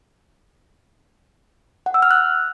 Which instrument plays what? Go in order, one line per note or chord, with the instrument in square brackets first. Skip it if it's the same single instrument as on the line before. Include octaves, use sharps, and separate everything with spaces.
[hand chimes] F#5
E6
F6
F#6